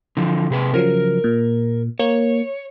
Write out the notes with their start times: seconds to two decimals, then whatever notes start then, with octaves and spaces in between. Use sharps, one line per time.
0.17 D3 E3 F3
0.50 C3 G#4 B4
0.74 C#3 F3 F#3 A#4
1.24 A#2
2.00 A#3 C#5